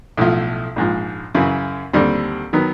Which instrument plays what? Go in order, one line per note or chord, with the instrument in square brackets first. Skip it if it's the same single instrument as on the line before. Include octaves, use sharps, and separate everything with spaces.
[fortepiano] B1 A2 F3
A#1 G#2 F3
F#2 C#3 E3
D#2 D3 G3 C4
D#3 F#3 B3